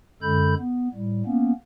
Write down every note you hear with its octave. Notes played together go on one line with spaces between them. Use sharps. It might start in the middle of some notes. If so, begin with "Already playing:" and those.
F#2 D3 G#3 A4 B5 G6
B3
A2 G3
A#3 B3 C#4